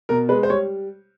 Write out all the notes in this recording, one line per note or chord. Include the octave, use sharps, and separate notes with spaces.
B2 A#4
G#3 B4
C5
G3 C#5